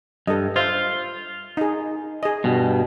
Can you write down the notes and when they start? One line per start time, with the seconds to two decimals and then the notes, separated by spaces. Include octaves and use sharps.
0.27 G2 A4 D#5
0.56 F4 C5 E5 F5
1.57 D#4 G#4
2.23 G#4 D#5
2.44 G2 B2